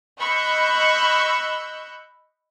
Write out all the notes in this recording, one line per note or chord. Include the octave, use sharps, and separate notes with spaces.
D#5 B5 C#6 E6 F#6 G6